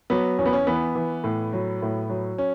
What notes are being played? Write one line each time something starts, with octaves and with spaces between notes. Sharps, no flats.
F#3 B3
E2 C#4
B3
C#4
E3 B3
E3
A2
F#3
A2
F#3
C#4